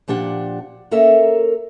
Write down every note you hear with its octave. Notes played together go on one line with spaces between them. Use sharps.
A#2 F3 D4 G4 F#5
A#3 C#4 A4 A#4 E5